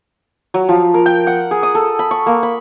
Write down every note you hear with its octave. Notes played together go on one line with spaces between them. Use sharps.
F#3
F3
A#4
G5
F#5
G#4
D#6
A4
B5
C#6
A#3
B5